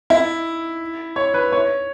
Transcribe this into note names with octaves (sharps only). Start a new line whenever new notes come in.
E4
C#5
B4
C#5